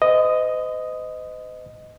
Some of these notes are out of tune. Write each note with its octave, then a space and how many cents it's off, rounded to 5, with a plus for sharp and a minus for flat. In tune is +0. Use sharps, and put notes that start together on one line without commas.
C5 -45 D#5 +0